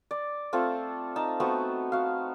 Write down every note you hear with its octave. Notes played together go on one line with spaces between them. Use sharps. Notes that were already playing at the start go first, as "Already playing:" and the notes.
D5
A3 C4 F4 A4
D#4 A5
A3 B3 C4 F#4
F#4 F5